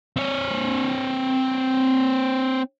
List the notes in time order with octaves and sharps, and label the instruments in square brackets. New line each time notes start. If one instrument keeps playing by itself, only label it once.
[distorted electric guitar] C4 C#5